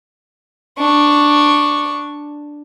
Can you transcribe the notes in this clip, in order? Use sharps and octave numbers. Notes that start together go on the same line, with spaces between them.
D4 C#6